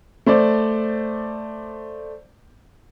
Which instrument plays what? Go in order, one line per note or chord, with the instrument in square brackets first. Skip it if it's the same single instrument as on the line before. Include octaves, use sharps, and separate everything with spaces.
[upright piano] A3 C5 D5